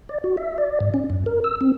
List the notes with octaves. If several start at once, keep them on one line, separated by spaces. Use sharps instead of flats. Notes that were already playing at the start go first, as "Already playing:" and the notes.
D5
F#4
E5
D5
G#2
C#4
F#2
A#4
E6
C4